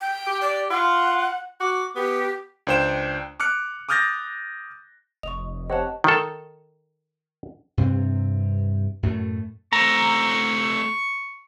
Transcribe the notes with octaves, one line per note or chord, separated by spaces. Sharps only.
G5
G4
D5
F4 F#5
F#4 D6
B3 G4
C#2 D4 C5 G5 E7
D6 F6 F#6 C#7
D6 D#6 F6 G6 A6 A#6
F1 D#5 C#6 F7
C4 G4 C#5 D#5 F#5 A5
D#3 A4
G2 C3 C4
F#2 A2 A3
A3 C4 A#5 C#6